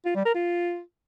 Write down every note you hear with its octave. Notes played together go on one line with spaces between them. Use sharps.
F4
G3
A#4
F4